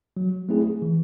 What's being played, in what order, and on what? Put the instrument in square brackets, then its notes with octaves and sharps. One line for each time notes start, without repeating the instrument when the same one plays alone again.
[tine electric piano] F#3
A3 C4 E4 G#4
E3